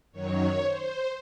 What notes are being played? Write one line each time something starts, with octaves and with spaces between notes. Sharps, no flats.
F#2 D#3 F#3 C#5
C5